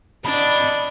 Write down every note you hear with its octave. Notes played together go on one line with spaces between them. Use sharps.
D4 D#5 B5